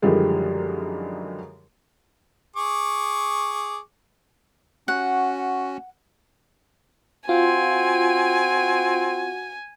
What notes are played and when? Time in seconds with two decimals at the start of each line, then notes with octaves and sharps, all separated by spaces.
0.02 F#2 D3 D#3 F3 G3 G#3
2.56 G#4 C#6 D6
4.88 C#4 F#4 F#5
7.29 C4 F4 F#4 G#5